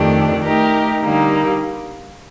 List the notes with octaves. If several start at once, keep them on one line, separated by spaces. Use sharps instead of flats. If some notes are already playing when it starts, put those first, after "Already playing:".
Already playing: F2 D#3 A3 D4 G4
A3 D#4 G4 A#4
D3 G3 A#3 D#4